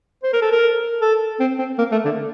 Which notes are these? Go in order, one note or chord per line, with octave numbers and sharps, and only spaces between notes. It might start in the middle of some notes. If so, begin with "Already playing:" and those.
C5
A#4
A4
A#4
A4
C4
C4
A#3
A3
D3